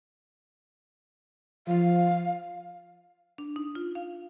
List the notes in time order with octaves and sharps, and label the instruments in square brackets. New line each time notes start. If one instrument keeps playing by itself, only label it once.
[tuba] F3 [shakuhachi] F5
[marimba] D4
D#4
F4
F5